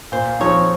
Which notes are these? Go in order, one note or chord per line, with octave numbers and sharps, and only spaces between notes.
A#2 C5
F3 C4 D#4 C#5